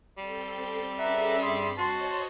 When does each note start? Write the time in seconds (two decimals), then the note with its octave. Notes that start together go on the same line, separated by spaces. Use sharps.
0.18 G3 C4 A4 C6
0.99 C#4 G#4 A4 B4 E5 F#5 A#5
1.42 G2 C4 G#4 C6 B6
1.78 F#4 C5 C#5 D#5 A5 C6